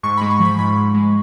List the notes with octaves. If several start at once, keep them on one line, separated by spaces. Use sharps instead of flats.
G#2 C#6
G#3 B5
C#6
F3
B5
G#2 B5
G#2
G#3